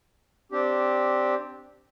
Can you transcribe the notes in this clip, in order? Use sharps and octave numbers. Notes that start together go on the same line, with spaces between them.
C4 D4 G4